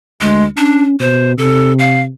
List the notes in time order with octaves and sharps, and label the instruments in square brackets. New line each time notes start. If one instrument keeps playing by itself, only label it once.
[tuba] D2 [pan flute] G#3
[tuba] C#4 [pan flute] D4
[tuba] B2 [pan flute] C5
[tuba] C3 [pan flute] A4
[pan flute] F5